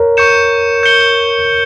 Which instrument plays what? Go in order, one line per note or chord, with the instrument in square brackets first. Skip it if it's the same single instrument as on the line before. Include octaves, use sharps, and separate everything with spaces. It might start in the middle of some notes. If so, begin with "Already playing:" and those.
Already playing: [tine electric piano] A#4 C#5
[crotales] C#6 G6 C#7 E7
G6 C#7 G7